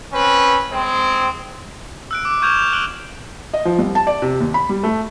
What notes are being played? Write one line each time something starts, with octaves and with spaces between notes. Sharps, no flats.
C4 C#4 B4
G#3 C4
E6 F#6 D7
D6
C#6 F6 G6 G#6 E7 F7
F7
F#6 G6 D7 F#7 G7
D#5
F3
C2
A5
D5
C3
D#2
B5
G3
A3